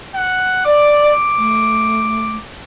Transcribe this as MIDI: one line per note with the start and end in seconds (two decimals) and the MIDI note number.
0.15 0.65 78
0.66 1.12 74
0.66 2.44 86
1.38 2.36 57